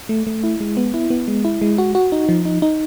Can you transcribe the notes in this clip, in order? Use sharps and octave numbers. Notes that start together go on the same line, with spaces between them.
A3
A3
E4
G#3
B3
E4
B3
G#3
E4
G#3
F#4
F#4
D#4
F3
D#4
D#4